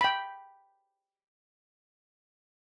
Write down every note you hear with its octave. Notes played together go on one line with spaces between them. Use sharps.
G5 B5